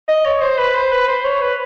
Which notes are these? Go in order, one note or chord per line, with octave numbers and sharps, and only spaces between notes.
D#5
C#5
C5
B4
C5
B4
C5
C#5
B4